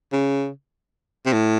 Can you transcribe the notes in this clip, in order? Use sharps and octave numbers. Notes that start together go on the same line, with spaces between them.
C#3
C3
A2